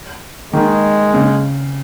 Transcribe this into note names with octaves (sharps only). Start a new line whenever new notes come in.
D#3 G#3
C#3